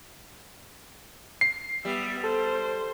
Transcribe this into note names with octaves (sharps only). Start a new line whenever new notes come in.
C7
G3 B3 E5
A4 C5